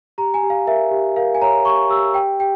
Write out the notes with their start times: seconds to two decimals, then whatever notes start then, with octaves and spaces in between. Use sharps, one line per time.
0.18 G4 A#5
0.34 G#5
0.43 G4
0.50 F5
0.67 A#4 E5
0.91 G4
1.16 A#4 F5
1.35 G#5
1.41 C#5 A#5
1.65 G4 C#6
1.90 G4 E6
2.14 G4 G5
2.40 G4 G5